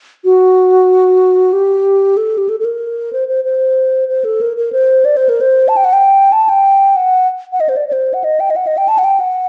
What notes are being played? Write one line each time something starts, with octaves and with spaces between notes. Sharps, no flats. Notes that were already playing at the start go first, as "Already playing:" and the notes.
F#4
G4
A4
G4
A4
A4
A#4
C5
C5
C5
C5
A4
A#4
A#4
C5
D5
C5
A#4
C5
A5
G5
F#5
G5
A5
G5
F#5
F#5
D#5
C5
D5
D5
C5
F#5
D#5
G5
D#5
F#5
D#5
G5
A5
F#5
G5
F#5